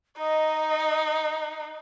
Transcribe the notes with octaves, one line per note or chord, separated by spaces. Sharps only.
D#4 D#5